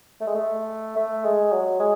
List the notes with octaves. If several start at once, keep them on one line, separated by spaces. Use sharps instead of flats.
A3
G#3
A3
A3
G#3
F#3
G#3